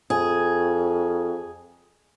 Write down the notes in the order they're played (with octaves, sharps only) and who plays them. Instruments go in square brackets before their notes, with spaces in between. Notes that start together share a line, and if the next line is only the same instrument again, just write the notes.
[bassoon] F2 [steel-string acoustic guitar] G#4